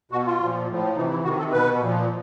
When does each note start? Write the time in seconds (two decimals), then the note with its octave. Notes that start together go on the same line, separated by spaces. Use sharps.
0.12 B2 F#4
0.26 F4
0.40 A#2 F3
0.69 A2 F3
0.96 C3 E3 D#4
1.11 E4
1.24 C3 D#3 F#4
1.39 A4
1.52 B2 B4
1.81 A#2 F3